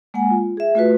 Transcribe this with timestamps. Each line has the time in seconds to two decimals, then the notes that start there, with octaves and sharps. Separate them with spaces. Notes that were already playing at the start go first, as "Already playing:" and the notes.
0.14 G#3 A#3 F#5 G#5
0.31 F4
0.57 G#4 E5
0.75 A3 F4 F#4 B4